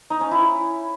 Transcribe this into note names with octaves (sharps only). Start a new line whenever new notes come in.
D#4
C#4
E4